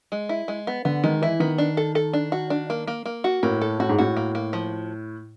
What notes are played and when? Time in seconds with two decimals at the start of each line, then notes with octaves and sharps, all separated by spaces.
0.12 G#3
0.29 E4
0.48 G#3
0.67 B3
0.85 D3 B3
1.04 D#3 G#3
1.22 E3 E4
1.40 D#3 B3
1.58 D4
1.77 A4
1.95 A4
2.13 D4
2.32 F#4
2.50 D4
2.70 A#3
2.87 A#3
3.06 A#3
3.24 F#4
3.43 A2 A#3
3.61 A4
3.80 A2 F#4
3.89 G#2
3.98 A2 F#4
4.17 A#3
4.35 A#3
4.53 F3